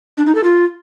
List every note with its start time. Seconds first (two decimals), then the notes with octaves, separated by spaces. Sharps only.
0.17 D4
0.26 D#4
0.35 A4
0.44 F4